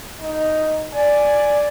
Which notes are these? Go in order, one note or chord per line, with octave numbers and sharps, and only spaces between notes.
D#4
D5 G#5